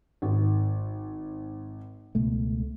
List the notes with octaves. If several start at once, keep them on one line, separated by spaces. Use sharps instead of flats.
G#1
C#2 B2 A3